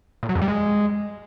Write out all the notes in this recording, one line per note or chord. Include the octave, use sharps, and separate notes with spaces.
A#2
F#3
F2
G3
G#3